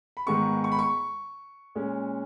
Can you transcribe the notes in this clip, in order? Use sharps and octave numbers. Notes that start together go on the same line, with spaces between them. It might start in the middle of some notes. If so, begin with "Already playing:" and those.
B5
G#2 D#3 G#3 B3 C#6
C#6
B5
C#6
A#2 G#3 C#4